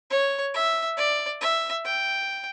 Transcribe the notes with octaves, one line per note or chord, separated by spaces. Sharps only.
C#5
E5
D5
E5
G5